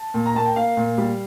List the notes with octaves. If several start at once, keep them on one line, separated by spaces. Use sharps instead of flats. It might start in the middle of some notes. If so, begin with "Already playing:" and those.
Already playing: A5
A#2
A#5
A#3 A5
G5
A#3 F5
A#2
G3